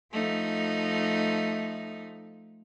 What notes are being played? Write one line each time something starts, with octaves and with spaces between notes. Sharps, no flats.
F3 A3 D#4